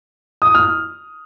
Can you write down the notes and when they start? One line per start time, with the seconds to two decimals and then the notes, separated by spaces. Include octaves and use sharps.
0.42 D#6
0.55 F6